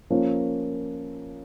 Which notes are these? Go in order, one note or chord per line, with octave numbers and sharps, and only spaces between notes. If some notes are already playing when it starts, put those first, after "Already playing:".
F3 A#3 C#4